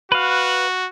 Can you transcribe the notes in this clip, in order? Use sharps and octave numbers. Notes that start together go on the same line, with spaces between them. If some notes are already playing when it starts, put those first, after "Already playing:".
F#4 B4 F5